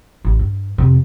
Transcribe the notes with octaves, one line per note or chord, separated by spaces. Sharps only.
A1
G2
F2 C3